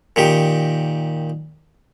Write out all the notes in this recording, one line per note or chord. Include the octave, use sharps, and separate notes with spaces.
A#2 D#3 G4